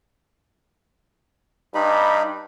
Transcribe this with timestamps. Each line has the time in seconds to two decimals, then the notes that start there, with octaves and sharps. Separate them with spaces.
1.75 G2 D#4 B5